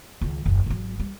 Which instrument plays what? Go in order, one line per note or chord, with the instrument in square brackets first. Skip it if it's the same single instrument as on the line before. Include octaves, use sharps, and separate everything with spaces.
[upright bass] C#2 D#3
F#1 D#2
G#1 F#3
G3